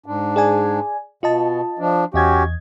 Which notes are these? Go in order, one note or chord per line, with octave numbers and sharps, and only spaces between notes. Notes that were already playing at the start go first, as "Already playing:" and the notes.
G#2 D4
G#4 D5 G#5
B2 F4 D#5 A5
F3 D4
E2 C#4 F#4 G4 D#5 G#6